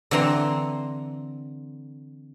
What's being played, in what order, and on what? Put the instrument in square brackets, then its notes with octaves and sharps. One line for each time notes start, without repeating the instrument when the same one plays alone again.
[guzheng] D3 E3 C4 A#5 C6